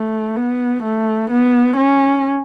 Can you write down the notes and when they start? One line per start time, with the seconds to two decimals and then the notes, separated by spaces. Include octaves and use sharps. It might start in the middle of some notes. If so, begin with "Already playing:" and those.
Already playing: A3
0.37 B3
0.84 A3
1.31 B3
1.77 C#4